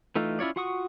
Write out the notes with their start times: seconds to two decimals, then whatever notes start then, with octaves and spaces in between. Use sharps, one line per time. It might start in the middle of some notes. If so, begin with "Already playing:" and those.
0.16 E3 A3 D#4 F4
0.39 C#4 E4 F4 C#5 D5
0.56 F4 F#4 F#5 C#6 D#6